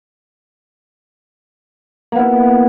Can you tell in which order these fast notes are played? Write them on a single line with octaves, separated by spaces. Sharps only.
A#3 B3 E4